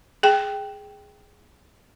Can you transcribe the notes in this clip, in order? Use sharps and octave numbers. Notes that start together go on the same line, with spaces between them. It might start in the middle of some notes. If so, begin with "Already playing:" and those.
G#4 G5